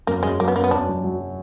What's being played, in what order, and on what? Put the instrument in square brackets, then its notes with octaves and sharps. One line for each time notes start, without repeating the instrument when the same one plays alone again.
[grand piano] F#2 [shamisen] A#3
[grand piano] F#2 [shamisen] G#3
[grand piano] F#3 [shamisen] A#3
[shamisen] B3
[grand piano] F#2 [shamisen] A#3
[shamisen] B3
[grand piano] F#2 [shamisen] D4
[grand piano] F#3
F#3